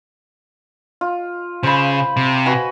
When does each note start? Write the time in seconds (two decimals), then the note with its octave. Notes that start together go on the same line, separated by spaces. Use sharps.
1.01 F4
1.63 C#3 C5 B5
2.17 C3
2.46 F#4 B4 G#5